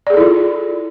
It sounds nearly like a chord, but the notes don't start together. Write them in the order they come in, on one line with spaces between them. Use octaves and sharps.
D5 G#4 A4 E4 F4